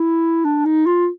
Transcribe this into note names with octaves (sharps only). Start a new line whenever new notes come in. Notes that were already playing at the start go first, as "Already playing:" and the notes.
Already playing: E4
D4
D#4
F4